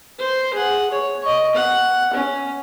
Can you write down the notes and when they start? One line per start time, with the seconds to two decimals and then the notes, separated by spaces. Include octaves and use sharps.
0.19 C5
0.53 G#4 F#5
0.91 C#5
1.23 D#5 C#6
1.55 F#5
2.13 C#4